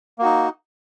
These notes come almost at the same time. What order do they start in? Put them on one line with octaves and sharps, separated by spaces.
A#3 F#4 D#4